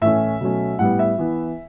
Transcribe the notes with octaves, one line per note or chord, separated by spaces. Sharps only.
A2 E3 A3 C#4 E5
B2 F#3 A3 C#4
A2 G3 B3 F#5
E5
E3 B3